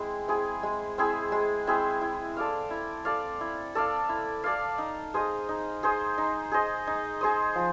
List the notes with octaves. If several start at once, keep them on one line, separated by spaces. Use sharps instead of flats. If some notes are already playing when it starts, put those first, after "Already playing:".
Already playing: G#3 C4 E4 G#4
C4 E4 G#4
G#3
C4 E4 G#4
G#3
C4 E4 G#4
E4
A4 D5 F5
E4
A4 D5 F5
E4
A4 D5 F5
E4
A4 D5 F5
D#4
G#4 C5 D#5
D#4
G#4 C5 D#5
D#4
G#4 C5 D#5
D#4
G#4 C5 D#5
F3